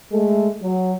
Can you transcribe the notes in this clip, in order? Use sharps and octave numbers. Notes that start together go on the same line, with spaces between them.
G#3 A3
F#3